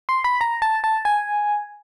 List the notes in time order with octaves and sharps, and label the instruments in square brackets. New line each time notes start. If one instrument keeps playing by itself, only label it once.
[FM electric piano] C6
B5
A#5
A5
A5
G#5